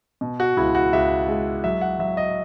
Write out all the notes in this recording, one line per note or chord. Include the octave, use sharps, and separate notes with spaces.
B2
F#4
C#2 E4
F#4
C#2 E5
G#3
F#3 E5
F#5
F#3 E5
D#5